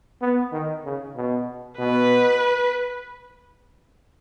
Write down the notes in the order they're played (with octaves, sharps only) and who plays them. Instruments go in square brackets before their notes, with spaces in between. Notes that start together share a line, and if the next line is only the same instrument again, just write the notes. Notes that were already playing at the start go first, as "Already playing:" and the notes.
[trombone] B3
D#3
C#3
B2
[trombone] B2 [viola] B4